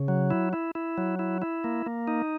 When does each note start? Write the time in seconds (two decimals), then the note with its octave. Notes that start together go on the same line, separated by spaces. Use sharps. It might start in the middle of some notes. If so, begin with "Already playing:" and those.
Already playing: C#3
0.08 F#3
0.31 E4
0.53 E4
0.75 E4
0.98 F#3
1.19 E4
1.42 E4
1.64 A#3
1.86 A#3
2.07 D#4